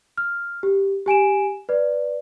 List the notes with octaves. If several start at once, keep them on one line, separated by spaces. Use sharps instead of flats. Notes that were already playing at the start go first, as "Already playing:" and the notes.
F6
G4
G4 G#5 D7 E7
B4 D5